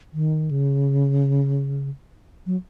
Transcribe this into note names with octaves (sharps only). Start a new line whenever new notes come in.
D#3
C#3
F#3